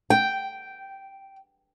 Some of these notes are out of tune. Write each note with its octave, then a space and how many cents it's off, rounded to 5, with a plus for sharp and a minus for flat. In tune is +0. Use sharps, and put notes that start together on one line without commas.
G5 -5